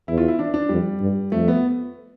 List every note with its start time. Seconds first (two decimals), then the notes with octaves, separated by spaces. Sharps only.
0.08 E2 E4
0.18 F4
0.28 E4
0.39 D4
0.54 D4
0.69 F2 G3
1.01 G2
1.32 F2 A3
1.48 B3